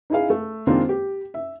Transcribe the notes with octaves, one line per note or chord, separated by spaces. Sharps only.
D#4 E4 G#4 F5
A3
D#3 G#3 A#3 C4 D4 F4
G4
E5